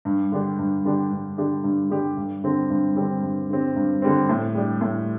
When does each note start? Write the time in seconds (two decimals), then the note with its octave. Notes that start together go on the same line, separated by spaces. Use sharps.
0.05 G2
0.32 D3 G3 D4 G4
0.59 G2
0.85 D3 G3 D4 G4
1.12 G2
1.38 D3 G3 D4 G4
1.64 G2
1.90 D3 G3 D4 G4
2.17 G2
2.44 D3 G3 C4
2.70 G2
2.96 D3 G3 C4
3.23 G2
3.50 D3 G3 C4
3.76 G2
4.02 D3 G3 C4
4.29 A2
4.55 G3 D4 G4
4.81 A2